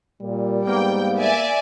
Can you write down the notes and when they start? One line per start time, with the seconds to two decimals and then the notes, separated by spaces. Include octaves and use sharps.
0.22 A#2 G3
0.67 G#2 A#3 B3 G5
1.19 D5 E5 G#5